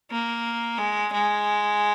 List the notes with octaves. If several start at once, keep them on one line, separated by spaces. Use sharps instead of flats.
A#3
G#3
G#3